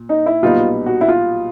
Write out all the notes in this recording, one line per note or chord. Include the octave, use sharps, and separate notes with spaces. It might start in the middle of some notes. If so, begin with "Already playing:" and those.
Already playing: A#2
D#4
E4
B1 A#2 G3 B3 D#4 F4
F#4
E4
F4